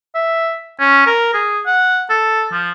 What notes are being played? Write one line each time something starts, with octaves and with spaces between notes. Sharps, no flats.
E5
C#4
A#4
G#4
F#5
A4
F3